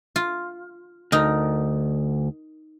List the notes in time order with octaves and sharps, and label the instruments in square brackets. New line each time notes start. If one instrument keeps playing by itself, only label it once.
[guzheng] F4
[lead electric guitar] D2 [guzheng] D#4 A#4